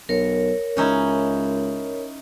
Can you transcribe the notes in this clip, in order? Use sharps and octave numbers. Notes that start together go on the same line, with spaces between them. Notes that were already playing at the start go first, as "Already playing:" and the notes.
B1 A#4 C#5
C#2 C#4 D#4 E4